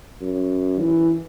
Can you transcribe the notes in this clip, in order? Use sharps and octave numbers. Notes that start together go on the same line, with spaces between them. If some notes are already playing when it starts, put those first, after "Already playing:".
F#2
E3